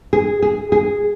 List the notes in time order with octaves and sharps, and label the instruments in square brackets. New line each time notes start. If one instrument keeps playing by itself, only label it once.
[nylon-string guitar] G#4
G#4
G#4